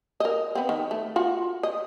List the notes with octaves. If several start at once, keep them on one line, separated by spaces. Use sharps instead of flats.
A#4 D#5
B3 C4
D#3
A3
F4 F#4
D#5